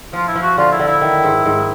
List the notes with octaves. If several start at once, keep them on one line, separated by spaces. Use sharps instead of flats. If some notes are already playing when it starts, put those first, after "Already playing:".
F3 F4
E4
F3
F#4
D3 F4
E4
D3
E4
D#3
G#2
G#2